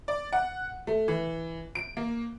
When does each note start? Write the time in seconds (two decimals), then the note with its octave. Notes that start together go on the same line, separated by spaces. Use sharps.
0.08 D5
0.33 F#5
0.87 A3
1.08 E3
1.75 D7
1.97 A#3